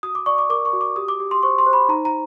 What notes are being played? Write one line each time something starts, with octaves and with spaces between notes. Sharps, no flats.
F#4 D#6
D6
D5 C#6
D6
A#4 D6
C#6
F#4
D6
G4 D#6
D6
G4
C6
C5 C#6
C6
C5
B5
D#4 A#5
A#5